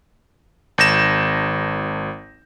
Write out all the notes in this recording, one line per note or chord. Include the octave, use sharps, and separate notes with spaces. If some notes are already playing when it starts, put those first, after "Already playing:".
G#1 G6 A#6 E7